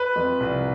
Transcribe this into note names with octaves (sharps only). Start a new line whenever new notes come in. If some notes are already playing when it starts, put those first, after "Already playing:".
Already playing: B4
F2
C2